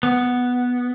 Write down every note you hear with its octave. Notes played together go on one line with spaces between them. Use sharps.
B3